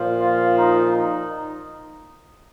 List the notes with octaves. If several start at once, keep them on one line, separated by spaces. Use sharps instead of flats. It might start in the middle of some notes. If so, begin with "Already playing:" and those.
Already playing: A#2 F3
F4
D#4
D#4